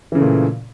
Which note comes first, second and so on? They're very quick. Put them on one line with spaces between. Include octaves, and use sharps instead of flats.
E3 C#3 A3 A#2